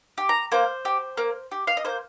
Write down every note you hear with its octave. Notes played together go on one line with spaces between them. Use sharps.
G4
A#5
A#3 C5
G4
A#3
G4
F5
D#5
A#3 C5